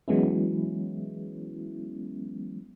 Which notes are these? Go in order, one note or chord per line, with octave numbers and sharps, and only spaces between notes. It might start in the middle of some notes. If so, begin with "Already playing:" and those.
E3 F#3 G#3 B3 C#4 E4